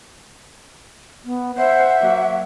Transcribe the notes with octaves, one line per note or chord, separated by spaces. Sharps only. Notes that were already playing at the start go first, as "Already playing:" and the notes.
B3
C5 E5 F#5
F#3 A#3